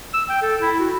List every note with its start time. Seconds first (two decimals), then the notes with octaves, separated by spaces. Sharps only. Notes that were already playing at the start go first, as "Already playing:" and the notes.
0.14 E6
0.29 G5
0.42 A4
0.61 E4
0.79 F#4